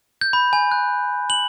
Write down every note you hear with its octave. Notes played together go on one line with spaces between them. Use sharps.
G6
B5
G#5
F#6
F#7